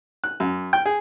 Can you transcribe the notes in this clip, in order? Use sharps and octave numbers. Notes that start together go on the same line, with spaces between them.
F#6
F#2
G5
G#4